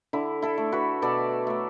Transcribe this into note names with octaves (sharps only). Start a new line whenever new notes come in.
D3 E4
E4 A4
A3
F#4 B4
B2 A4 D5
F#3 A3